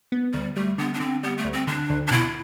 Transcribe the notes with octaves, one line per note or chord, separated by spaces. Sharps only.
B3
D2 G3
G3 A3
D3 B3
D4
D3 C4
G3 B3
A3
D2
C4
D3 D4
D2
D4
B2 E4